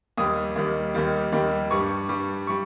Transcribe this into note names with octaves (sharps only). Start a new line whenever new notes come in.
D#2 D#3 G3 D#6
D#2 D#3 G3
D#2 D#3 G3
D#2 D#3 G3
G2 G3 C#6
G2 G3
G3 C#6